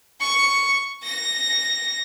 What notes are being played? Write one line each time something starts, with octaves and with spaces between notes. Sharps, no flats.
C#6
A#6